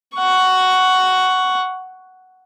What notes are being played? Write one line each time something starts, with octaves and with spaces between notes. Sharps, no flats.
F#5 C#6